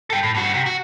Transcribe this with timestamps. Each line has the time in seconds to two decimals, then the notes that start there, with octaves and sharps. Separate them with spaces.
0.10 A4 G5
0.23 A2
0.35 G2 F#4
0.54 C3
0.66 F#4